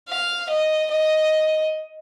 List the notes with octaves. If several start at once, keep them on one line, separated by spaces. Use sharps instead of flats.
F5
D#5
D#5